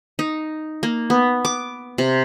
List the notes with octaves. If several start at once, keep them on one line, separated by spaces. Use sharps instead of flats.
D#4
A#3
B3
D6
C3